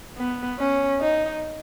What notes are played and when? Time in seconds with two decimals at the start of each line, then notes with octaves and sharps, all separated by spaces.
0.17 B3
0.59 C#4
1.01 D#4